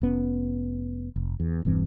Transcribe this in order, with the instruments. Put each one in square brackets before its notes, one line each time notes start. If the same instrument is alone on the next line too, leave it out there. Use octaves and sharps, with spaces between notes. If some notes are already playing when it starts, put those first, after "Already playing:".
[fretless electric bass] F1 B3 C#4
F1
E2
E1 G2 E3 C4